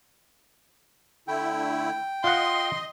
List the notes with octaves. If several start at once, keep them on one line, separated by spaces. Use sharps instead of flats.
D3 A3 E4 G5
F4 D#5 F#5 C6